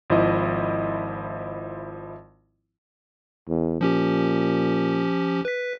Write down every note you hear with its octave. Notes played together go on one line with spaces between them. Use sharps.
G#1 F3 E4 D#5
E2
A#2 F3 C#4 G4
B4 B6